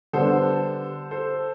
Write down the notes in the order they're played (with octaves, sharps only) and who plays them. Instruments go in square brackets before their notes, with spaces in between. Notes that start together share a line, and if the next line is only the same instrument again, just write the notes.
[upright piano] D3 G3 B3 D4 [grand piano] A4 C5
[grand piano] A4 C5